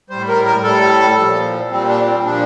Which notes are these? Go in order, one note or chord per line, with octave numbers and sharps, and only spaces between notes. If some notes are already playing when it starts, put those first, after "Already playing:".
A2 G3 C5
A#4
A#4
A2 G3 A4
A#2 F3
A#2 G3 C4
D4
C4
A#2 F3 D4